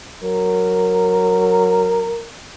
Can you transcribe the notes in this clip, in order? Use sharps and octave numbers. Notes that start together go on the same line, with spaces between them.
F#3 A#4